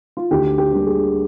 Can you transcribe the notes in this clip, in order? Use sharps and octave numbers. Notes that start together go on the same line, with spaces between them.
F4
D2 G4
G4
D3 G3 A#3
G#4